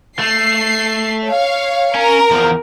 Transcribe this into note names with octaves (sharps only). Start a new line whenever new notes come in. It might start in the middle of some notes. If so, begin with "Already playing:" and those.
A3 C7
C#5 F5
C#4 A#4
E2 F3